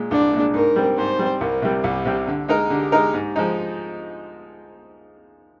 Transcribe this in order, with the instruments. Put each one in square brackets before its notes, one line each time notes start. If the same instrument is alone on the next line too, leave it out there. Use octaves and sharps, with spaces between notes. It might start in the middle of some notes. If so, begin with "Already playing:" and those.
Already playing: [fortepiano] A#2 G#3
[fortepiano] C2 [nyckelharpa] D4
[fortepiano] A#2 G#3
[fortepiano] G#2 [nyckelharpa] A#4
[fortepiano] G3 C4
[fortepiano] G#2 [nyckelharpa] C5
[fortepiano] G3 C4
[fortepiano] C2 [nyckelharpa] A#4
[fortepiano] C3 G3
[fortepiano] C2 [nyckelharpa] G4
[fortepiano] C3 G3
D3
G#3 D#4 A#4
[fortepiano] D3 [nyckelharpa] G4
[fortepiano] G#3 D#4 A#4
G#2
F3 G#3 D#4